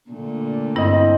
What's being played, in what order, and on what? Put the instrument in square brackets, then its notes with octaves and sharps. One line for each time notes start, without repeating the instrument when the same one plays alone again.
[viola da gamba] A#2 D3 A3
[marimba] G2 E4 [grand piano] C4 D#5